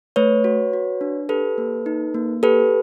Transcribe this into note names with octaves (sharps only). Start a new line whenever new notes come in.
A3 B4 C#5
F#4
F#4
D4
G4 A4 B4
A#3
D#4
A#3
G4 A4 B4